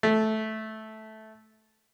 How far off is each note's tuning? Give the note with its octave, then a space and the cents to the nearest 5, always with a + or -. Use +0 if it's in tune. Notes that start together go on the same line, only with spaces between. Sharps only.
A3 -10